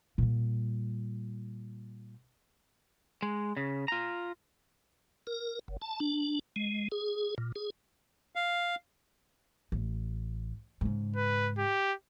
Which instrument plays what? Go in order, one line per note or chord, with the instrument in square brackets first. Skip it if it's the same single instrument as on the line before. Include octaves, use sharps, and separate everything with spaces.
[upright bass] A#2 G3
[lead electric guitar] G#3
C#3
F4 A#5
[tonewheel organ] A#4
F#1
A5
D4
G#3
G#4
A#2
G#4
[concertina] F5
[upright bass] A1
G#2 C#3
[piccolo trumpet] B4
G4